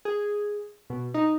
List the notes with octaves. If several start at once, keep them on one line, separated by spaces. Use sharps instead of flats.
G#4
B2
D#4